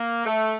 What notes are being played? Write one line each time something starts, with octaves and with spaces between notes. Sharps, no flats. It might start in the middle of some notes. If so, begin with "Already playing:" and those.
Already playing: A#3
A3